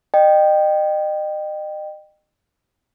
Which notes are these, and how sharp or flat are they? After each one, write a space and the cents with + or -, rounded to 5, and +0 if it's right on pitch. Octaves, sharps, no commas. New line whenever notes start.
D#5 -35 G5 +0